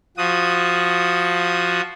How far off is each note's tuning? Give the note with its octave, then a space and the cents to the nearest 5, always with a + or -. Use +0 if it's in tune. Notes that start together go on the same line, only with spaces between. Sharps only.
F3 +0 F#4 +0 D#6 +0